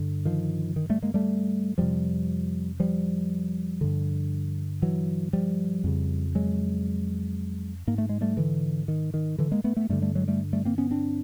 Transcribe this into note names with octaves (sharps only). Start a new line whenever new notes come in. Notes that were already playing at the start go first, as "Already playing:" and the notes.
Already playing: G2 D3
D#3 F3
D#3
G3 A3
G#3 A#3
G3 A3
F2 C3 F3 G3
F3 G3
G2 D3
E3 F#3
F3 G3
F2 C#3
F#3 G#3
G#2 A#3
A3
G#3
G3 A3
D3 E3
D#3
D#3
D3 E3
G#3 A#3
A3 B3
A3 B3
G2 D3 G3 A3
G3 A3
F#3 G#3
G3 A3
G3 A3
A#3 C4
B3 C#4
C4 D4